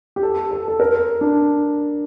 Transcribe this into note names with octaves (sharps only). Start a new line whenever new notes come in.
G4
A4
A4
A4
A#4
D4